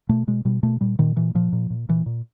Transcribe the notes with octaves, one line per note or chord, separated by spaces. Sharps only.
B2 A3
B2 G#3
B2 G3
B2 A3
A#2 G3
A#2 D#3
A#2 E3
A#2 F3
A#2
A#2
A#2 E3
A#2